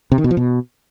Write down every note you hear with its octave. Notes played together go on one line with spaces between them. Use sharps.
C3
D#3
B2
F3
B2